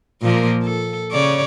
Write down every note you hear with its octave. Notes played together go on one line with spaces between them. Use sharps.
A#2 F3 A#3
A4
C#3 C#5 D5